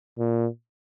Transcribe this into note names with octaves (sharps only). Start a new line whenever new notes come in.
A#2